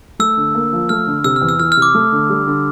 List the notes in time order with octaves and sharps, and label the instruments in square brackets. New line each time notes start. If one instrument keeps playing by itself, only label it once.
[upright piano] A3 [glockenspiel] E6
[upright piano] D3
A#3
F3
[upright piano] A3 [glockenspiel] F6
[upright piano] D3
[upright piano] C3 [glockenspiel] E6
[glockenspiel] F6
[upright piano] E2
[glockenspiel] E6
[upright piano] E3 [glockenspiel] F6
[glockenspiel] F6
[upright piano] C3
[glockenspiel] D6
[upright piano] A3
D3
G3
D3